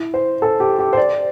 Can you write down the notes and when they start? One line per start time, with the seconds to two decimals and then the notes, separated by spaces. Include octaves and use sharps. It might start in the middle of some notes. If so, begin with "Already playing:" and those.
Already playing: E4
0.14 C5
0.42 A4
0.60 G4
0.79 G4
0.93 C5
0.97 D5